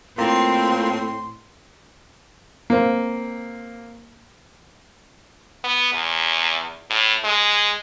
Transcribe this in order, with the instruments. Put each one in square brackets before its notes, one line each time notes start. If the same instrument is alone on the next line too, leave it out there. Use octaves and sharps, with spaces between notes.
[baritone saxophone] A2 [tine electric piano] A#3 F4 A#5 [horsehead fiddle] C4 [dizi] C6
[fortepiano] A#3 C4
[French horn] B3
E2
A2
G#3